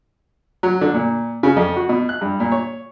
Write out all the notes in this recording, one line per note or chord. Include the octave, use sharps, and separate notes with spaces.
F#3
D3
A#2
C#3
F2
F#4
B2
F#6
G2
A#2
C#5